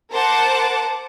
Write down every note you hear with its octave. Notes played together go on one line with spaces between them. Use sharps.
A#4 C5 F#5 A5 D6